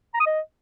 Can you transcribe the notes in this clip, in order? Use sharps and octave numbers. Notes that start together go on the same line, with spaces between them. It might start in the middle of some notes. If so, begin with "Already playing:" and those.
A#5
D#6
D#5